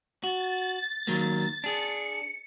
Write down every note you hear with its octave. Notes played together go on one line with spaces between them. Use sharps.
F#4 A6
D#3 F#3 A#3
D4 G#4 C#7